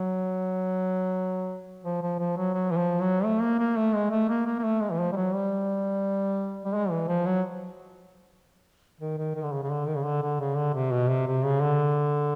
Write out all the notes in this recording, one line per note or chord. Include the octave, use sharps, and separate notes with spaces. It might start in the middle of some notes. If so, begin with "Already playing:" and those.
Already playing: F#3
F3
F3
F3
F#3
F#3
E3
F3
F#3
A3
A#3
A#3
A3
G#3
A3
A#3
A#3
A#3
A3
G#3
E3
F3
G3
F#3
G3
G3
G#3
E3
F3
F#3
D#3
D#3
D#3
D3
C#3
C#3
D3
D#3
C#3
D3
D3
C#3
D3
C3
B2
C3
C3
C#3
D3